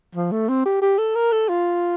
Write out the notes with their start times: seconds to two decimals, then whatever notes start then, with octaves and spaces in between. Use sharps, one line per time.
0.15 F3
0.31 A3
0.48 C4
0.65 G4
0.81 G4
0.98 A4
1.15 A#4
1.32 A4
1.49 F4